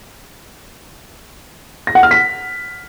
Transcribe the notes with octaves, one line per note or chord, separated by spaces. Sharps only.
A#6
F#5
F6
B6